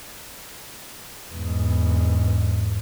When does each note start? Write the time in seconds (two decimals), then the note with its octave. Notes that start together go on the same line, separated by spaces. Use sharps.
1.33 E2 G#2